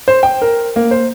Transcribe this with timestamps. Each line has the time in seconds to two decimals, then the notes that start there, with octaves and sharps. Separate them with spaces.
0.08 C5
0.23 G5
0.42 A#4
0.76 A#3
0.91 C5